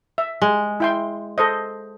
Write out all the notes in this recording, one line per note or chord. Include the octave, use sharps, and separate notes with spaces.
E5
G#3
E4 G5 C6
A4 C5 D#5